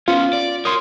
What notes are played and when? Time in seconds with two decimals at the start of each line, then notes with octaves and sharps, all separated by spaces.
0.08 B3 C#4 F4
0.33 D5
0.65 A#4 C#5 C6 D#6